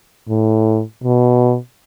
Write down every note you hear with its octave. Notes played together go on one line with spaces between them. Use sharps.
A2
B2